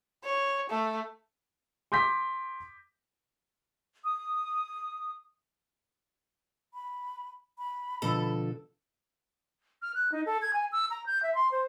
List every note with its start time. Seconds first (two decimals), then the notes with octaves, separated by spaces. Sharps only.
0.24 C#5
0.70 A3
1.92 C6 D6 G6 A#6 B6
4.04 D#6
6.74 B5
7.58 B5
8.02 B2 D3 F3 A4
9.82 F6
9.94 F#6
10.12 D#4
10.26 A4
10.42 G#6
10.53 G#5
10.72 E6
10.90 A#5
11.06 G6
11.23 E5
11.35 C6
11.51 C5